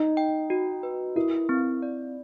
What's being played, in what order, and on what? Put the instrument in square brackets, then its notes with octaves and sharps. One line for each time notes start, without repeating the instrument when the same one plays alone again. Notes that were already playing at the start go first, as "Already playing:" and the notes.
Already playing: [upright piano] D#4 [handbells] D#5
[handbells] G5
F#4
B4
[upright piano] E4 [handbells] A#4
[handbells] C4
D5